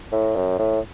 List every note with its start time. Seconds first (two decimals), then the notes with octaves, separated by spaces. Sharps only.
0.12 A2
0.36 F#2
0.59 A2